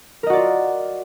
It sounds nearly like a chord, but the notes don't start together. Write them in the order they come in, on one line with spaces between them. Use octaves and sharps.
A#4 D#5 F#4 D5 F4